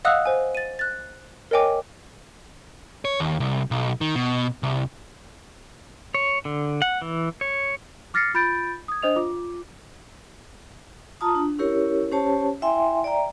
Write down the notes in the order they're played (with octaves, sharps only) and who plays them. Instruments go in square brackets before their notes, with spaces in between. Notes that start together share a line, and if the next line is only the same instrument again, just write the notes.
[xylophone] D#5 F5 F#5 D#6 E6 F#6
C5 G#5
A6 D#7
F#6 A6
A#4 C#5 D#5 G5 G#5 D6
[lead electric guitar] C#5
D#2
C2
B1
D#3
B2
C2
[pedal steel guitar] C#5
D3
F#5
E3
C#5
[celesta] D6 F6 A6 A#6 C7 C#7
F4 B5 G6 A6 D7
D#6 G#6
D4 C5 D#5 D#6 F7
F4 D6
[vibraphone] F4 A5 A#5 D#6
D4
C#4 E4 G4 A#4 C#5
C#4 G4 C5 C#5 A5
E4 E5 G5 G#5 C6
D5 E5 G5 A#5